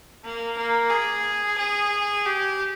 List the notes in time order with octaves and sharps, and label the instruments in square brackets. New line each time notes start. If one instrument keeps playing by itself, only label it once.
[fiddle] A#3
A#3
G#4
G#4
G4